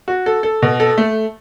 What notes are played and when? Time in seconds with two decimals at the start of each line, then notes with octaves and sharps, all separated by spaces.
0.08 F#4
0.26 A4
0.43 A4
0.62 B2
0.80 A4
0.98 A3